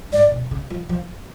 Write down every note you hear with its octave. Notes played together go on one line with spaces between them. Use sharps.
G#2 D5
B2
C#3
F3
F3